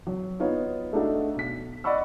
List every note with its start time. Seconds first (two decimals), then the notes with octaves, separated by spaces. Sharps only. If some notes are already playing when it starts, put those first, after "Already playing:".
0.07 F#3
0.40 B3 D#4 F4 C#5
0.93 A3 D4 D#4 F#4 A4
1.36 B1 B6
1.84 D5 D#5 F#5 B5 C#6 E6